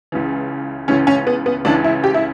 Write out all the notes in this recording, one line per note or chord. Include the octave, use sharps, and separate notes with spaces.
C#2 C#3 E3
C#2 C#3 E3 C#4
C#4
B3
B3
C#2 C#3 E3 D4
E4
G4
E4